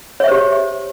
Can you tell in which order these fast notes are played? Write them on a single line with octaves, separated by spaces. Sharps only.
C#5 E5 C5 G4